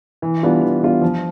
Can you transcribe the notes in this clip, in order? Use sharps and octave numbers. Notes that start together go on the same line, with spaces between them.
E3
G3 B3 D4 F4
E3
G3 B3 D4 F4
F3